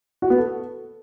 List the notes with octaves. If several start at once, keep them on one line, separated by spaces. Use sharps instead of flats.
F#4
B3
A4